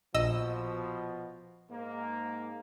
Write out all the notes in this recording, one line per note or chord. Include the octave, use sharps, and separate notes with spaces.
A#1 B2 F3 D#5 E6
G#2 A#3